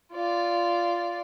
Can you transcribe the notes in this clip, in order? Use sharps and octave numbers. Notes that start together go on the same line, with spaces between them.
F4 D5